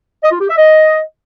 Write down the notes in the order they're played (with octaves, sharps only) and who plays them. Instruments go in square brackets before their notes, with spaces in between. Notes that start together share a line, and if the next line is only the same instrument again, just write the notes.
[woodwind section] D#5
F4
G4
E5
D#5